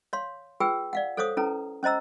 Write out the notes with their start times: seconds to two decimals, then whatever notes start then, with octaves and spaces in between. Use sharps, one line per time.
0.13 C#5 F5 C6
0.60 F4 G#4 B4 G5 E6
0.93 D5 F5 F#5
1.17 A4 C5 C#5 F5 D6 D#6
1.37 C#4 E4 A4 B4 A#5
1.83 C#4 C5 D#5 A#5 E6